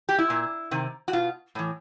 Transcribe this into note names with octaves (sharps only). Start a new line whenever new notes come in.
G4
E4
A#2
C3 D#3
F#4
B2 F4
A2 E3